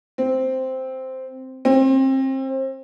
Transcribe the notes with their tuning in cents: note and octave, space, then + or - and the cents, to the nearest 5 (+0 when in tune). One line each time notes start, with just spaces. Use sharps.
C4 -5
C4 +30